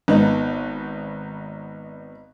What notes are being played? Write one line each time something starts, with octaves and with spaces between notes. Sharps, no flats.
G#1 B3 D#4